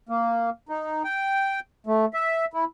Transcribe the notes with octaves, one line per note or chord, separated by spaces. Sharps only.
A#3
D#4
G5
A3
E5
E4